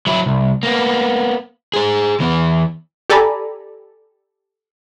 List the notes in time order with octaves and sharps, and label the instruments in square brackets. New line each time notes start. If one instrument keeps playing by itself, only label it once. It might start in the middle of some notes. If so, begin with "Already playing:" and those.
[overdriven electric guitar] F#3 E4
C2
A#3 B3
G#4 C5
E3 B3
[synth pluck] G4 A4 D5 G#5 A#5 B5